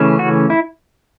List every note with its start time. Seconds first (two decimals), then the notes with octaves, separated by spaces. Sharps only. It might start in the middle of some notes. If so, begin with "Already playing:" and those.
Already playing: C#3 E3 A3 C#4
0.19 F#4
0.50 E4